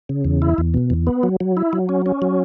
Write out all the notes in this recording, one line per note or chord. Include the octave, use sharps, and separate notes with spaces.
C#3
E2
E4
E2
B2
E2
B3
F#3
F#3
E4
F#3
C#4
C#4
F#3